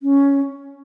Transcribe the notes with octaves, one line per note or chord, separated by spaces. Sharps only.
C#4